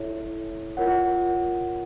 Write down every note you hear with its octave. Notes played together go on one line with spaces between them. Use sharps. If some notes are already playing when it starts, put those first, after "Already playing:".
Already playing: E4 A4 C#5 E5
F4 A#4 C#5 F#5